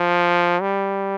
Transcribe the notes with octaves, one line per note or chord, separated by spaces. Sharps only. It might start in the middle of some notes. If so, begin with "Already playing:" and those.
Already playing: F3
G3